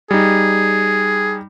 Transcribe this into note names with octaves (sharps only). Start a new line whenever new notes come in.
G3 D#4 G#4